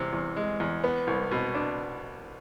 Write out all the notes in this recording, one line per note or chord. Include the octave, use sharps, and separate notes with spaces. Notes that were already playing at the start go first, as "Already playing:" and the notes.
Already playing: E2 C3
E2
G#3
E2
B3
C2
B2
D4